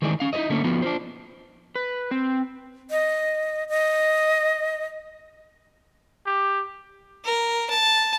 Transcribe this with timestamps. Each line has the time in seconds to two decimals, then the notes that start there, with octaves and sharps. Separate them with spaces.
0.02 D#3 E3 G#3 A3 G#4 D5
0.20 C#4 F5
0.33 D#4 E4 A#4 C#5 D#5
0.50 D3 A3 A#3 C#4
0.64 F3 B3 F4 F#4
0.82 D4 F4 C5
1.76 B4
2.11 C4
2.91 D#5
3.69 D#5
6.26 G4
7.25 A#4
7.70 A5